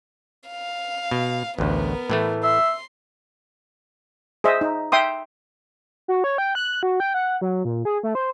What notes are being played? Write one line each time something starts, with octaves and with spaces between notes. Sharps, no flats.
F5
B2
A1 D2 B3 A#4
A2 E3 A3
E5 C6
G#4 C5 D#5 E5
D#4
E5 G5 C6 D#6
F#4
C#5
G5
F#6
F#4
G5
F#5
F#3
A#2
G#4
A3
C5